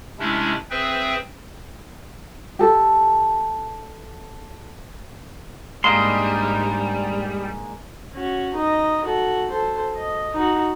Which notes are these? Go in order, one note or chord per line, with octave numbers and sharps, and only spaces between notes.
C3 G#3 A3 C#4 D4 E4
C4 G#4 B4 C5 E5 G5
G4 A4
G#2 G3 G#3 A#3 D4 D#5 C6
C#4 F#4
D#4 D#5
F#4 A4
A4 C5
D#5
D#4 F#4